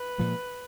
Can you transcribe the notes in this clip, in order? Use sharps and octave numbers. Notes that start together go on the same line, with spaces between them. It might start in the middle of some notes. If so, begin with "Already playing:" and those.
Already playing: B4
A#2 F3 G#3